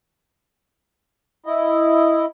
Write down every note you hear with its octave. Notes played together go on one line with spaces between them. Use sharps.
E4 D#5